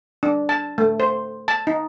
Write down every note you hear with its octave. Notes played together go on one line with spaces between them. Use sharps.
D4
A5
A3
C5
A5
D#4